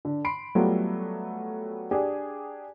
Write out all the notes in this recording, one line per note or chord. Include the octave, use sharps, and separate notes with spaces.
D3
B5 C6 C7 D7
F#3 G3 A3 B3 F4 G4
D4 G4 G#4